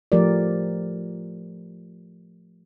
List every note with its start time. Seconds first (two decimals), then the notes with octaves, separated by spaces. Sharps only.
0.12 F3 A3 G4 A#4 D5